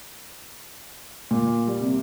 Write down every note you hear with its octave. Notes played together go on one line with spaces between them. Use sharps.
A#2
G3
C3